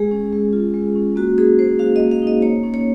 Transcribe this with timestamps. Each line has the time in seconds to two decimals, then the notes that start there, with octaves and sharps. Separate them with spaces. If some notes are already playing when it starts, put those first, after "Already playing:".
Already playing: G#3 G#4
0.11 C#4
0.33 G#3
0.53 F4
0.74 G#3
0.96 C#4
1.16 A#3 F#4
1.37 D#4 G#4
1.59 A#3 C5
1.79 F#4 F5
1.96 D#5
2.00 A#3
2.11 F5
2.22 D#4
2.27 D#5
2.42 A#3 C#5
2.64 C#4
2.74 C#5